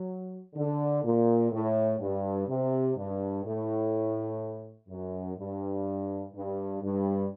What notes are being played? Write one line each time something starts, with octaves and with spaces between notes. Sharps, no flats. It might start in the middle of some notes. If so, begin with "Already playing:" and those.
Already playing: F#3
D3
A#2
A2
G2
C3
G2
A2
F#2
G2
G2
G2